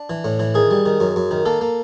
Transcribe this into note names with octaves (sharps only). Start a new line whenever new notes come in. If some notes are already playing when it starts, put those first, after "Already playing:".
Already playing: D4
E3
A2
E3
D#3 G#4
G3
D#3
F#2
F#2
D#3
A#3 A4
A#3